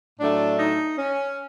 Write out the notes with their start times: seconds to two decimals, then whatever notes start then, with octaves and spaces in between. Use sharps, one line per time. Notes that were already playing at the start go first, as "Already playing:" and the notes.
0.19 A2 F#3 A3 D4
0.58 D#4
0.97 C#4